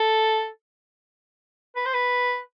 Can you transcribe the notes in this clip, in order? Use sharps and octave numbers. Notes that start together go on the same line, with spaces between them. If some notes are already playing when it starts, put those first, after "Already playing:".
Already playing: A4
B4
C5
B4